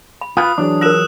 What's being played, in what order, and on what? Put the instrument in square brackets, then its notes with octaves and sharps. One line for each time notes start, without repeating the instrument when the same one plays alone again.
[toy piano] B5
[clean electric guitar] F4 B4 [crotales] D#6
[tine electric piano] E3 F#3 G#4 [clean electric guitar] D4
[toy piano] F4 A#4 [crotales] E6 F#6 E7